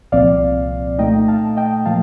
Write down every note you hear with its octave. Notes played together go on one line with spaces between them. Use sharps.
C2 A#2 F3 C4 D5 F5
A#2 A3 D#4 D#5 G5
F5 A5
D#5 G5
A#2 F3 A#3 F5 A5